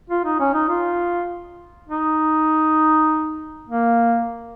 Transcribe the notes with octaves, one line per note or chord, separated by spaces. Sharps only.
F4
D#4
C#4
D#4
F4
D#4
A#3